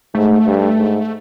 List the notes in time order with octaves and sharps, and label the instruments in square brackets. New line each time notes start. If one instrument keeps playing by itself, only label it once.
[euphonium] G#2 [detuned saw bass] A3
[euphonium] G2
G#2